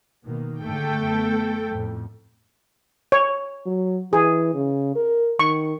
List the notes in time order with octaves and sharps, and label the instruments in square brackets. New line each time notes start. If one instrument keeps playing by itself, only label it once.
[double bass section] B2 D#3 A#3
[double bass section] G#2 D3 [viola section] A3 A4 G5
[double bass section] F#2 B3
F2 A2
[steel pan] C#5
[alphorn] F#3
[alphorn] E3 [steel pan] G#4
[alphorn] C#3
A#4
[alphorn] D#3 [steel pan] C#6